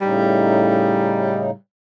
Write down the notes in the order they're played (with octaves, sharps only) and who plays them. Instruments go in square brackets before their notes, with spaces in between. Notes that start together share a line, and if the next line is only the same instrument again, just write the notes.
[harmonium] A2 C#3 D#4 [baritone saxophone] G3